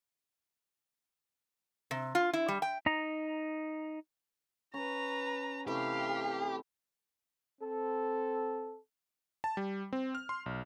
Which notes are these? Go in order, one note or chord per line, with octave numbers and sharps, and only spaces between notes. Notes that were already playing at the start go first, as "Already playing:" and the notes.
C3
F4
E4
G3
G5
D#4 A#5
C#4 B4 A#5
C3 E3 A3 G4 F5
C4 A4
A5
G3
C4
F6
C6
B1